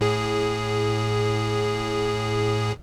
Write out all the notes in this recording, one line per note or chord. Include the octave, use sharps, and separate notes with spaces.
A2 G#4